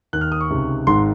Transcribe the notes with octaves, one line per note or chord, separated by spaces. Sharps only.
D#2 D#3 F#6
F6
D#6
C#6
C#2 C3 D#3
G#1 G#2 D#3 C6